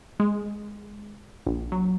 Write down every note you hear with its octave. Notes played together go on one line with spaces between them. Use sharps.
G#3
A#1
F#3